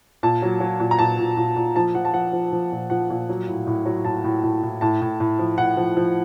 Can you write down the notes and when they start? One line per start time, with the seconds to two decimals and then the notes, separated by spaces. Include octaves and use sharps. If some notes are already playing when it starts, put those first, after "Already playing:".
0.23 A#2 A5
0.42 F#3
0.60 F#3
0.80 A#2
0.91 A#5
0.99 A#2 A5
1.19 A#2
1.37 A#2
1.56 A#2
1.76 F3 A5
1.95 F3 F#5
2.05 A5
2.14 F3 F#5
2.33 F3
2.52 F3
2.72 A#2
2.90 F3 F#5
3.10 A#2
3.29 F#3
3.48 A2
3.67 A2
3.85 F#3
4.05 A2 A5
4.24 A2
4.43 A2
4.63 A2
4.81 A2 A5
5.01 A2
5.20 A2
5.39 F3
5.58 A2 F#5
5.77 F3
5.97 F3